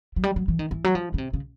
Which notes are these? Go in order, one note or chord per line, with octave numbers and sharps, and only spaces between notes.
F#3
G3
F#3
E3
D#3
E3
F#3
F3
C#3
C3
C#3